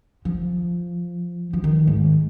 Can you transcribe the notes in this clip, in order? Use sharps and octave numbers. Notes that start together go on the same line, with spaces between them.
F3
F3
D#3
G#2